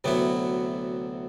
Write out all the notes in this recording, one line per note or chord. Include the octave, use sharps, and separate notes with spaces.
D2 C3 F#3 B3 E4